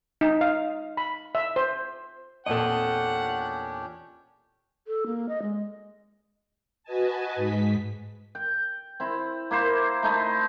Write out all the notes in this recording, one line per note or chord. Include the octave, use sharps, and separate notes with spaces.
D#4
F5
B5
E5
C5
E2 A#2 C#4 D4 G4 A4 D#5 F#5
A4
A#3
D#5
G#3
F#4 B4 D#5 G#5 A5
G#2 B6
G5
C4 E4
A#3 E4 C5
A3 D#4 E4